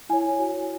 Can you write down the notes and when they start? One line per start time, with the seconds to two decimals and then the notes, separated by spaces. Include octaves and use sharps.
0.09 E4 C#5 G#5
0.39 F#4 C#5